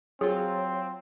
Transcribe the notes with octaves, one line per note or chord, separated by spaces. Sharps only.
F#3 C4 F4 G#4 C#5